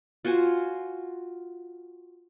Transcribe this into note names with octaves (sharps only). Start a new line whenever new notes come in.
F4 F#4 C5 G#5